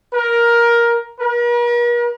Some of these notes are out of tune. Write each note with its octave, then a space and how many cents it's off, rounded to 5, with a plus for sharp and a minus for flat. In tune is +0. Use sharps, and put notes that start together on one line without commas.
A#4 +10
A#4 +45